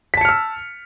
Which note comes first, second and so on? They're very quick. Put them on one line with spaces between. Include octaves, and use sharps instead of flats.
B6 A5 C#7 F6 E6